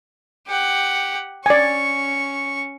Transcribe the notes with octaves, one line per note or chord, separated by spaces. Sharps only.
G4 F#5
C#4 D5 G#5 C#6